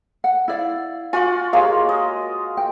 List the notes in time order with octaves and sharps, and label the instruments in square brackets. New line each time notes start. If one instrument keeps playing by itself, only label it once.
[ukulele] F#5
E4 D5 F5
[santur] F4 F#4 F#5 [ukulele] G#5
[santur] G#3 A#3 [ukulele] G4 C#5 F5
[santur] D#5
[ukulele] G5